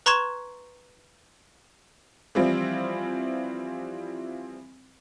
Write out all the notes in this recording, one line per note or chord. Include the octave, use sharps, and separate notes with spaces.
B4 A#5 C6 C#6 G#6 E7
E3 F3 G3 C4 E4 F4